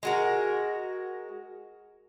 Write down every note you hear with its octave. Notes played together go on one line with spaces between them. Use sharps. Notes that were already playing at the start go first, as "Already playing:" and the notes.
G#3 F#4 A#4